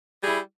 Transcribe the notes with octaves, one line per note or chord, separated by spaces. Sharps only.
G3 E4 G#4